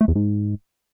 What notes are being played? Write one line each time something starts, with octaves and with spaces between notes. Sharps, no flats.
A3
E2
G#2